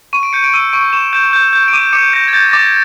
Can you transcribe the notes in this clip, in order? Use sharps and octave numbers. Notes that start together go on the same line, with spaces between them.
C#6 D#7
D7
G6 C#7
D7
E6 D#7
C#6 D7
C#6 E7
G6 E7
G6
G6
D7
D6 D#7
D6 C#7
G6 A#6
G#6
G6 A6
A#6
D6 A6